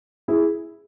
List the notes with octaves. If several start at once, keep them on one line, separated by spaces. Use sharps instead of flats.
E4 G#4